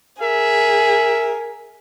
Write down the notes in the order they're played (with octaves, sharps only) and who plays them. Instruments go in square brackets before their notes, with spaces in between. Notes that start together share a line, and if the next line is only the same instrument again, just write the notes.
[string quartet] G#4 [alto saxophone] A#4 [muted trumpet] E5